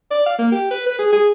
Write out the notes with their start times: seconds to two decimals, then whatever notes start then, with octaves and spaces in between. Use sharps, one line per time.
0.11 D5
0.26 F5
0.39 A#3
0.52 G4
0.71 B4
0.86 B4
0.99 G#4
1.13 G#4